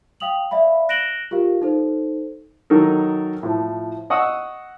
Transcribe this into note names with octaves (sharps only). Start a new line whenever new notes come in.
F5 G5 D#6 F7 F#7
D5 E5 F5 B5
F#6 A#6 D7 E7 F#7 G7
F4 G4 A#4 F5
D#4 A4 C5
D#3 F#3 D#4 A4 A#4
A2 F3
D#5 F#5 C#6 D#6 E6